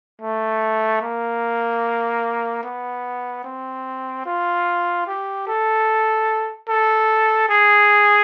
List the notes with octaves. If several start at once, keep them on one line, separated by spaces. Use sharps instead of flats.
A3
A#3
B3
C4
F4
G4
A4
A4
G#4